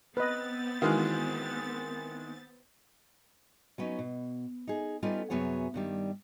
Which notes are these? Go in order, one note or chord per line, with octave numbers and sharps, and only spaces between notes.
B3 C4 B4 D#5 A6
D#3 E3 G#3 F#4 F5
F#3 B3 C#4 D#4
B2
D#4 G#4
G3 B3 C#4 D#4 F4 A4
F#2 C3 F#3 B3 G#4 C#5
G2 D#3 G3